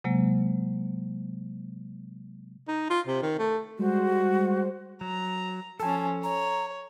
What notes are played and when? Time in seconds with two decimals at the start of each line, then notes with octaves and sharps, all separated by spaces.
0.04 C3 F#3 G#3 A#3
2.68 D#4
2.90 F4
3.07 C3
3.22 D#3
3.39 A3
3.79 G3 G#3 F#4 C5
5.01 F#3 A#5
5.80 F3 C#4 A4 G#5 A5
6.23 C#5 A#5